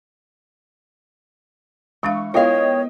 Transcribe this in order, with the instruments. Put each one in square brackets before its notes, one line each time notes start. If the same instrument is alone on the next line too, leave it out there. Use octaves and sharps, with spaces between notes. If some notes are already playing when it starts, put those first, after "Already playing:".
[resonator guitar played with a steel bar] E3 [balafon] G#3 D4 F5 [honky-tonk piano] C#6
[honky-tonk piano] B3 D#5 G5 [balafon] E4 F4 [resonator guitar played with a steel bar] A#4 F5 [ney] C#5